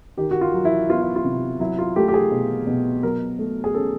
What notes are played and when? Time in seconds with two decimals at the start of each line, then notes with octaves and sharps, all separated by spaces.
0.17 D#3 G4
0.31 F#4
0.41 F4
0.54 F#3
0.65 E4
0.89 B3 F4
1.02 E4
1.16 F4
1.25 C3
1.60 F#3 E4
1.79 F4
1.96 A3 G4
2.08 G4
2.14 G#4
2.32 B2
2.67 B2
3.03 F#3 A#4
3.39 A3
3.64 G#4
3.74 C#4 A4